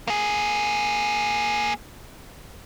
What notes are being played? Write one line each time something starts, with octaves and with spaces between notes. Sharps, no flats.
A#3 G#4